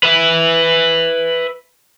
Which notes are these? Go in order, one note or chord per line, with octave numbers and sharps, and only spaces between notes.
B4 E5